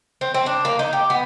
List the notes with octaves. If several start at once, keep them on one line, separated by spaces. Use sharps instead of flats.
C4
C4
D4
A#3
D#4
G4
B3